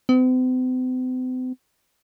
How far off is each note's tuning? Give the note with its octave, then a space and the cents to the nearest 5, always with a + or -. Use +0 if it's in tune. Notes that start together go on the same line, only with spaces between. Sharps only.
C4 -45